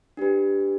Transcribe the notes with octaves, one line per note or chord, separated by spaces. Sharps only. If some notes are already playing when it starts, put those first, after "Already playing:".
D4 G4 B4